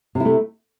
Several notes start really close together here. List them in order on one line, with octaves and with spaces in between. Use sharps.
C3 E4 A3